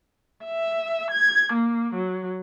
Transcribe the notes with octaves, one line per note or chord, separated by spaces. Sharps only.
E5
G#6
A#3
F#3